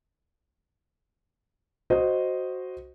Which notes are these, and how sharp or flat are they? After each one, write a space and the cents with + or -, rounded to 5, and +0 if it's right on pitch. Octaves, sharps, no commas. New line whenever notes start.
F#4 +0 C5 +0 D#5 +0